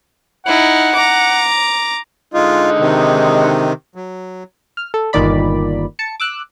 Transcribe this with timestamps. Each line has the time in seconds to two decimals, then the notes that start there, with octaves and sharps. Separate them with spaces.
0.46 D#4 E4 F#5
0.94 A#5 D6
2.34 D3 G#3 D#4 F4
2.79 C3 D#3
3.96 F#3
4.77 F6
4.94 A4
5.13 G1 A#2 D#3 D5 B5
5.99 A5 C#7
6.20 D6 E6 F#6